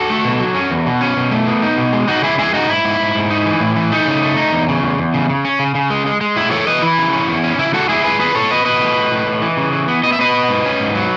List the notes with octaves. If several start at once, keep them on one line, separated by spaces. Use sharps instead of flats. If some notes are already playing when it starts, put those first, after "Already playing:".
Already playing: F#4 A4
A3
B2
F#3
C#4
E2
B2
C#4
B2
A3
B3
D#4
B2
G#3
C#3 D#4 F#4
G#3 E4 G#4
G#3 E4 G#4
C#3 D#4 F#4
G#2 E4
G#2
G#2
G#2
D#4
E3
A2
E3
A3 D#4
C#3
A3
D#4
E2
C#3
E2
E2
C#3
C#3
C#4
C#3
C#3
G#3
G#3
G#3
A2 E4
E3 A4 C#5
E3 B4 D#5
E3 E4
C#3
C#4
E2
C#4
C#3 E4
G#3 F#4 A4
G#3 E4 G#4
G#3 G#4 B4
E2 G#4 B4
B2 A4 C#5
E2 B4 D#5
E2 B4 D#5
A2
A2
A2
A2
E3
C#3
E3
B3
B3 D#5
E5
B3 B4 D#5
B3
G#2
C#4
G#2
F#3